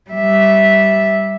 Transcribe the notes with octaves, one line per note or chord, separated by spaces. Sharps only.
G3 E5